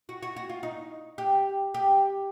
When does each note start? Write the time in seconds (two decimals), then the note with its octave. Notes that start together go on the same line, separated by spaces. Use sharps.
0.09 F#4
0.23 F#4
0.36 F#4
0.49 F4
0.63 D#4
1.18 G4
1.74 G4